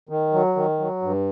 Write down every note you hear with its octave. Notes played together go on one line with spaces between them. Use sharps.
D#3
F#3
D#3
F#3
G2